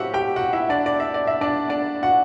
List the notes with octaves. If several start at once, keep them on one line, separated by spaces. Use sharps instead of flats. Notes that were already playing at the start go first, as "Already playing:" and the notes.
Already playing: A2 F#3 C4 F#4 G4 E5 F#5
G4 G5
F#4 F#5
E4 E5
D4 D5
D5
E5
D5
E5
D4 D5
D4 D5
F#4 F#5